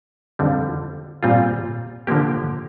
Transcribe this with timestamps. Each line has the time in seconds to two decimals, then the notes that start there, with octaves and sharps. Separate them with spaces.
0.39 F2 D3 G3 C4
1.23 A#2 G3 C4 F4
2.07 D3 F3 A#3 G4